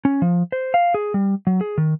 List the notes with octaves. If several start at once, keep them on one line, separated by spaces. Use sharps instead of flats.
C#4
F3
C5
F5
G#4
G3
F#3
G#4
D#3